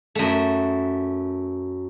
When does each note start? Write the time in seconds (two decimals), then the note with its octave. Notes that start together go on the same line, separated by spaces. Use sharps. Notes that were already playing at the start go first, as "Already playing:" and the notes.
0.15 F#2 A3